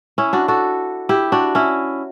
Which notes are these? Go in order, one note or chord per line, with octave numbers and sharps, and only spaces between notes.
C#4 E4
D4 F#4
F#4 A4
E4 G4
D4 F#4
C#4 E4